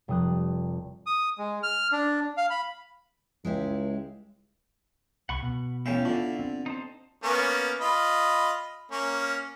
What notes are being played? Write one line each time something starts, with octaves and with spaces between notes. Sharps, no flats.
F1 G3 D#6 F#6
D#6
G#3
F6
D4
F5
B5
C#2 G#3 E4 G4
C2 F#5 B5 C#6
B2
A1 B3 C#4 E4 F5 G5 A5
D3 D4 F4
C4
D#4 C5 A5
A#3 B3 C#4
F4 D#5 B5
A#3 C#4